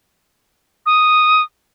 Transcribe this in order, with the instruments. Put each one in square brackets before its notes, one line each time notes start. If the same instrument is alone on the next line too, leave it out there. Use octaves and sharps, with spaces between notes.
[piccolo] D#6